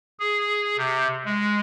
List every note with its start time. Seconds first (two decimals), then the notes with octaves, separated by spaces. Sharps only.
0.19 G#4
0.78 C3
1.25 G#3